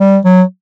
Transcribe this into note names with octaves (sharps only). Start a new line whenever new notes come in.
G3
F#3